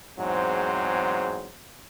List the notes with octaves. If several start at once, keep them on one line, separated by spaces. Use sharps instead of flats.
E2 G#2 F#3 C4 C5